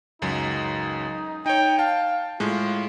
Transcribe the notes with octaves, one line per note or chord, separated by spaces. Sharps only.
C#2 F#2 F#3 D#4
D#4 C#5 G5
F5 A5
A2 G#3 F4